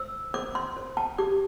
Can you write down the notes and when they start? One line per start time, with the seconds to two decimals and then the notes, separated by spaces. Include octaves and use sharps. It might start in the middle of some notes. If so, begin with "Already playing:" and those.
Already playing: C5 E6
0.34 C5 D6
0.55 C6
0.77 C5
0.97 A5
1.18 G4 D6